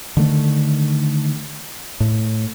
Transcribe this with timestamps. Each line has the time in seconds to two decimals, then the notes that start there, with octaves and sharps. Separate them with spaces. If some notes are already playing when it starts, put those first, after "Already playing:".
0.17 D3 D#3 A3
2.00 A2